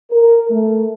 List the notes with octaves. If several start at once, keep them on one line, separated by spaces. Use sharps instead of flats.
A#4
A3